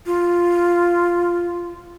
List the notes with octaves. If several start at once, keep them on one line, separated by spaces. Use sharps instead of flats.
F4